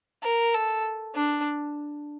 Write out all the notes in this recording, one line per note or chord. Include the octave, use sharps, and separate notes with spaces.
A#4
A4
D4